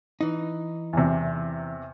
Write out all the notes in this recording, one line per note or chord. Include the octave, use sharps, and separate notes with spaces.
E3 D#4
E2 C3